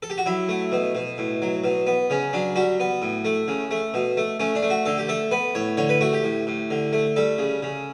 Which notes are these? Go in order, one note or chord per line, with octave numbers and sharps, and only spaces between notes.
A4
G4
F#4
F#3 E4
A3
B2
B2
A2
F#3
B2
B3
C#3 C#4
F#3 D4
G3 F#4
B3
A2
A3
C#3
A3
B2
A3
A3 C#4
D4
A3
F#4
D3 A4
G4
A3 A4
B3 B4
A2 C#5
D3 C#5
B4
A3 F#4
G4
A2
A2
D3
A3
G3 A4
C#3
C#3